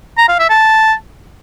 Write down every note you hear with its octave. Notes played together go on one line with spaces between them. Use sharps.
A#5
F5
E5
A5